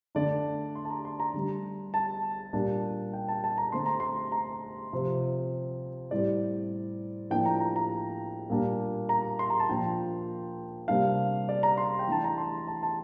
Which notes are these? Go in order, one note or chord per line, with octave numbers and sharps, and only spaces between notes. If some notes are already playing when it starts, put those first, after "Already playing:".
D3 A3 D4 D5
C6
A5
A#5
C6
A#5
D3 G3 D4
A5
A#2 G3 D4
G5
A5
A5
A#5
D3 A3 C4 C6
A#5
C6
A#5
C3 F3 C4
A2 G3 C4 D5
A2 F3 A#3 D4 G5
A#5
A#5
A#5
A#2 G3 A#3 D4
A#5
C6
A#5
A5
A#2 F3 A#3 D4 G5
C3 G3 A#3 D4 F5
D5
A#5
C6
G5
E3 A3 D4 A5
A#5
C6
A5
A5